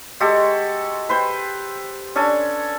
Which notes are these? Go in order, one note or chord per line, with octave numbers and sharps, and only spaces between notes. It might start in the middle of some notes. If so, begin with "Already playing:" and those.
G#3 F#4 G4 A4
B4 C5 G5
C#4 D4 A4 G#5